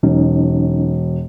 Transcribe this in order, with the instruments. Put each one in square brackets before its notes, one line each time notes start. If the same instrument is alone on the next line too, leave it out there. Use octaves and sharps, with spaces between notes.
[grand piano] E1 [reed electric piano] F#3 C#4 D#4